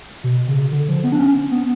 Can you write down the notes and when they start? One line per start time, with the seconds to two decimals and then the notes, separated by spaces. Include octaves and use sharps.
0.24 B2
0.48 C#3
0.72 D3
0.89 F3
1.04 B3
1.12 D4
1.19 C#4
1.51 B3